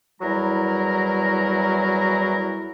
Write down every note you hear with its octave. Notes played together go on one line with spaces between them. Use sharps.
E2 F#3 G3 E4 A#4 A#5